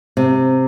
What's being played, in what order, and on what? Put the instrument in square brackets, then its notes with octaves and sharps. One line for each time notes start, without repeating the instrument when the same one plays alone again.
[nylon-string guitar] C3